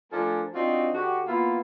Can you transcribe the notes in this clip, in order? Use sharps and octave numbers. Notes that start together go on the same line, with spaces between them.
F3 A3 D4 A4 A#4 G#5
C4 D4 D#4 F4 F#4
D3 F#4 G4
A#3 B3 E4 F4